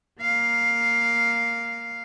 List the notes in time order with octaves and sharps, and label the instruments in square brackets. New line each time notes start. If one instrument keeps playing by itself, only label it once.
[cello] A#3 F5